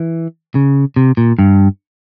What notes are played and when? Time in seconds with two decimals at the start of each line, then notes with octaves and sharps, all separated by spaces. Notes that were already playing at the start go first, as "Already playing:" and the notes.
Already playing: E3
0.55 C#3
0.96 C3
1.17 A#2
1.39 G2